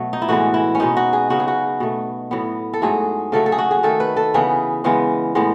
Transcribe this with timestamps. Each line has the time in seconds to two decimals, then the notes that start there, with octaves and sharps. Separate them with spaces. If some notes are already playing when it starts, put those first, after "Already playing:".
Already playing: B2 F#3 A3
0.13 D#4
0.22 E4
0.29 A2 E3 G#3 B3 F#4
0.54 E4
0.75 C#4
0.80 B2 G#3 B3 D#4
0.97 F#4
1.13 G#4
1.30 C#3 F#3 B3 F#4
1.40 G#4
1.48 F#4
1.80 B2 A3
2.31 A2 F#3 B3
2.73 A4
2.82 G#2 F#3 A3 G#4
3.32 C#3 F#3 A3 A4
3.46 A4
3.52 G#4
3.58 F#4
3.71 G#4
3.83 D#3 A3 A4
4.00 B4
4.16 A4
4.34 C#3 E3 B3 G#4
4.84 C#3 E3 G#3 B3
5.35 A2 G#3 B3